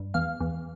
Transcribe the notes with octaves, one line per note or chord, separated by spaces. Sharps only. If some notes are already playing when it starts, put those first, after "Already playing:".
Already playing: G2
E2 F5
E2